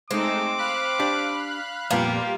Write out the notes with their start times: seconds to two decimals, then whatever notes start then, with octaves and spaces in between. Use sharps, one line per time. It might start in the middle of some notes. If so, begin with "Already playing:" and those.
0.11 G#3 A3 C4 D#4 D6
0.58 F5 B5 F#6
1.00 D4 G4
1.91 F2 A#2 G3 A#3 B3 F4 G4